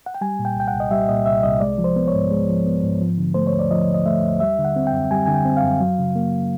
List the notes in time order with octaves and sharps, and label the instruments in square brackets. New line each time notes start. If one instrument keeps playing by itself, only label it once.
[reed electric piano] F#5
G5
G3 G#5
A#2
G5
C2 G5
F#5
C2
D#5
G3 E5
A#2 D#5
C2 E5
C2 D#5
G#3 D5
F3
C5
B3
C#5
G#2
G#3
F3
B3
G#2
F3
D3
A3 C5
C#5
D#2
D5
F3 D#5
D3
D#5
A3 E5
D#2
G3 E5
D3
F#5
C4
G5
F#2
G3 G#5
D3 G#5
G5
C4
F5
F#2
F#3
C#3
A#3